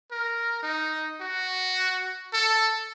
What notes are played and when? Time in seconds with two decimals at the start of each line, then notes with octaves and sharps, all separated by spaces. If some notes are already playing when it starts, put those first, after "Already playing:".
0.11 A#4
0.63 D#4
1.21 F#4
2.33 A4